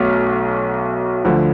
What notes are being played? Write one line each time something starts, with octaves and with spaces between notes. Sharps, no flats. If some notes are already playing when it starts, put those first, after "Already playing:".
Already playing: B1 B2 F#3 A3 F6
D2 D3 F3